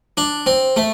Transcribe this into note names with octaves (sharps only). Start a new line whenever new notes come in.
D4
C4
A3